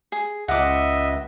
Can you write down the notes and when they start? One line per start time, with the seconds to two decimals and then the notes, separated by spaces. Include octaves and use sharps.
0.12 G#4
0.48 C#2 D#5 E5 F#5 D6